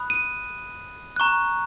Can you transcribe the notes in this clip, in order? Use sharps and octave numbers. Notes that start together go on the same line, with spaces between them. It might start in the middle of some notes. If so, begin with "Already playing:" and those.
Already playing: B5 D#6 F#6
D#7
A#5 C#6 F#6